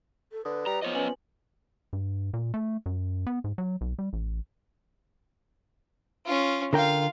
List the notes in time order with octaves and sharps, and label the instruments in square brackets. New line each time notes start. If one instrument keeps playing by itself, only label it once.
[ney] A4
[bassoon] D3 [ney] B4 [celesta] D#6
[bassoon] G3 [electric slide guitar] A#5
[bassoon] F3 [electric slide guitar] B3 C#5 D#5
[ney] C#4 [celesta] B4 G#5 F#7
[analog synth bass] G2
A#2
A3
F#2
B3
G#2
F#3
B1
G3
A1
[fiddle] C#4 F4
[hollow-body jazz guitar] D3 A#4 G5 [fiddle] F4 F5